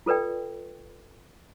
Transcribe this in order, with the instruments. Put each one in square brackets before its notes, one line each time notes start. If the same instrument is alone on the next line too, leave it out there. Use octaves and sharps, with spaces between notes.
[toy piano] F4 A4 B4 D5 G5